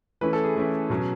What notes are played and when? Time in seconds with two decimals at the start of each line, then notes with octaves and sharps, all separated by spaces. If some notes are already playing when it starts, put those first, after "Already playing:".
0.21 E3 A3 C#4 E4 B4
0.33 A4
0.44 G#4
0.56 E3 A3 C#4 E4
0.90 B2 F#3 C#4